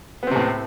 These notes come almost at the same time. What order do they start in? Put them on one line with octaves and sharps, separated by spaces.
B3 C4 C3 A2